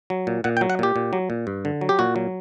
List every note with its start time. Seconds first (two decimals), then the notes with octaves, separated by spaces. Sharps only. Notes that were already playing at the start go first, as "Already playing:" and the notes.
0.10 F#3
0.27 A#2
0.44 A#2 F#5
0.57 G5
0.61 F#3
0.70 F#5
0.79 A#2 G4
0.96 A#2
1.13 F#3
1.30 A#2
1.47 G2
1.65 D3
1.81 F#3
1.89 G4
1.99 A#2 F#4
2.16 F#3